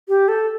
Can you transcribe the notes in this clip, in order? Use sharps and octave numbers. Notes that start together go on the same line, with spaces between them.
G4
A4